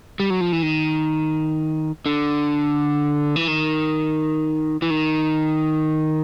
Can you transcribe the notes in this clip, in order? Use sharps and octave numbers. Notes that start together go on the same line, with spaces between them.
G3
F#3
F3
E3
D#3
D3
E3
D#3
E3
D#3